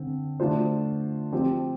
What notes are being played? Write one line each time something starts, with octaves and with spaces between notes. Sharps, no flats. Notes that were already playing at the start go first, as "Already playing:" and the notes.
Already playing: D3 C4
D3 A3 D4 F4 C5
F3 C4 G4 C5